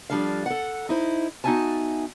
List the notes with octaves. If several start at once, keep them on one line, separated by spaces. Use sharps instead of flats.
F3 G3 D4 A4 F5
A4 F#5
D#4 E4 C5
B3 D#4 F#4 E5 G#5 A5